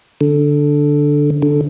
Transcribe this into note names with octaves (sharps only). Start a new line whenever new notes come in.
D3
D3